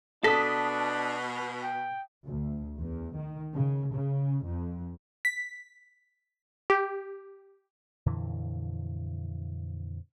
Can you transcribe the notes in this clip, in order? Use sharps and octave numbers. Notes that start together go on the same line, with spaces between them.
B2 D4 A4 D#6 B6
G5
D2
E2
D#3
C#3
C#3
F2
B6
G4
F2 A#2 D3 E3